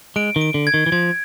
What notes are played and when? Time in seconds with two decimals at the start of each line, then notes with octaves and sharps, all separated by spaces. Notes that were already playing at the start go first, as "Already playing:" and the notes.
0.16 G#3 D7
0.36 D#3
0.41 D7
0.54 D3
0.67 G#6
0.74 D#3
0.86 E3
0.92 F3 G#6